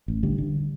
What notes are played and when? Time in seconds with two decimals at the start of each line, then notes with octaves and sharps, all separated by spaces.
0.08 A1
0.23 D3 G3
0.38 D3